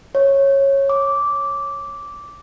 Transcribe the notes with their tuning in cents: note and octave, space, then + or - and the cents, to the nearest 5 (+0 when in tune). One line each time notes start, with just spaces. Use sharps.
C#5 -15
D6 -10